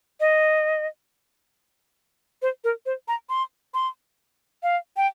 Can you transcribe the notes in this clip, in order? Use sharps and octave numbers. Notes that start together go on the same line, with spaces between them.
D#5
C5
A#4
C5
A#5
C6
C6
F5
G5